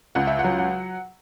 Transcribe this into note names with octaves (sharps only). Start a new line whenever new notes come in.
C#2 F#5
E5
F#5
F#3
F#5